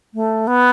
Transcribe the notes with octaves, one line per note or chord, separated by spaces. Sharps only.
A3
B3